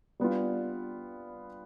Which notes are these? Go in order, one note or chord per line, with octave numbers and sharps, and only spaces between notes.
G3 B3 D4 F4